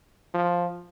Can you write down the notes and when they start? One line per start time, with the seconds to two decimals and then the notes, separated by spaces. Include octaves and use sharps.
0.34 F3